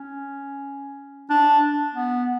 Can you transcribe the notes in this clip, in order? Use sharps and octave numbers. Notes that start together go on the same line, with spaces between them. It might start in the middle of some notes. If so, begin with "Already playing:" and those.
Already playing: C#4
D4
B3